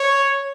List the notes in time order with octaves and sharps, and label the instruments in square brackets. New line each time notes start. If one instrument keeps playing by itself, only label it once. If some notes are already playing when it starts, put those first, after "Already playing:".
Already playing: [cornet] C#5